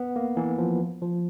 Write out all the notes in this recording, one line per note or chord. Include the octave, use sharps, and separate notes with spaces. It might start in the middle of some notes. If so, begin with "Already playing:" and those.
Already playing: B3
A#3
E3
F3
F3